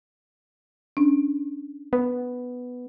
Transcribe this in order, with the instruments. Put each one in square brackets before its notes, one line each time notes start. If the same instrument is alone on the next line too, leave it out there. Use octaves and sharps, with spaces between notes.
[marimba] C#4 D4
[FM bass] B3